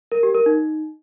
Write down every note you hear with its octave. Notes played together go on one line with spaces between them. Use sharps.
A#4
G4
A#4
D#4